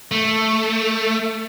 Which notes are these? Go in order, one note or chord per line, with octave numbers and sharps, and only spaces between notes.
A3